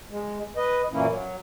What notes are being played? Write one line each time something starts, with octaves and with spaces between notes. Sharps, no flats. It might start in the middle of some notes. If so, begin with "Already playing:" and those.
G#3
B4 D#5
F#2 A#2 E3 A#3 C#4 E4
F#3